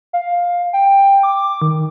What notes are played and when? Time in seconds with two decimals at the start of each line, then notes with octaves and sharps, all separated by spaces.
0.13 F5
0.73 G5
1.23 D6
1.62 D#3